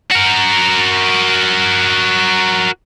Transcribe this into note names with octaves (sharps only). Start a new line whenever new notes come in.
F#4 A#4